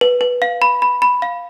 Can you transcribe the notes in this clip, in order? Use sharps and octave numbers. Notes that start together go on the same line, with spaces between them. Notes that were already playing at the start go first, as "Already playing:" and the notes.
B4
B4
F5
B5
B5
B5
F5